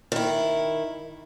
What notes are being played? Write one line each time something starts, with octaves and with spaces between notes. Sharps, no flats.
D#3 E4